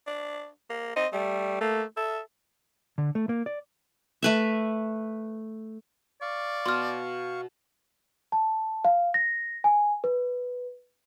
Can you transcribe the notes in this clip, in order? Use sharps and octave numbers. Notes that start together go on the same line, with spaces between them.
D4
A#3
C4 D#5
G3 A3
A3 A#3
A4 E5
D3
A3
A#3
D5
A3 B4 E5
D5 F5 C#6
B2 C6 F6
A5
F5
A#6
G#5
B4